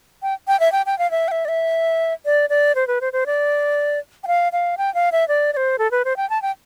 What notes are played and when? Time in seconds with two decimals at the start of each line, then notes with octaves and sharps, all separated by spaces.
0.23 G5
0.48 G5
0.60 E5
0.72 G5
0.86 G5
0.99 F5
1.11 E5
1.28 G5
1.31 E5
1.45 D5
1.48 E5
2.25 D5
2.50 D5
2.75 C5
2.87 B4
3.01 C5
3.13 C5
3.26 D5
4.24 G5
4.27 F5
4.52 F5
4.78 G5
4.94 F5
5.12 E5
5.28 D5
5.53 D5
5.57 C5
5.79 A4
5.91 B4
6.05 C5
6.17 G5
6.30 A5
6.42 G5